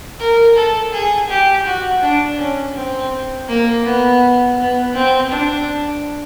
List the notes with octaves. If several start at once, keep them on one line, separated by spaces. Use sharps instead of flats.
A#4
A4
G#4
G4
F#4
D4
C#4
C4
A#3
B3
B3
C4
D4